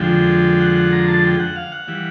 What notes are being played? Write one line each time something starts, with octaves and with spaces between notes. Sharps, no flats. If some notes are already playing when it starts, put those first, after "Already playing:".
Already playing: F2 D3 F3 G#3 G5
F#5
F#5
A#5
A5
G5
F#5
F5
F#5
E3 G3